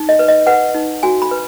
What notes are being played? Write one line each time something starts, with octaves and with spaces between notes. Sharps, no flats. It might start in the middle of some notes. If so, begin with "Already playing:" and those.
Already playing: D#4
D#5
B4
D#5
B4 F#5
D#4
F#4 G#5
B5
B4